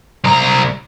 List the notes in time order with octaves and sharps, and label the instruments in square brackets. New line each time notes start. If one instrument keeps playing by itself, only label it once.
[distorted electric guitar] C2 A#5